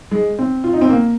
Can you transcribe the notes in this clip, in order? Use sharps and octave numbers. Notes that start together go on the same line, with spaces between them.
G#3
C4
F4
D#4
C4
A#3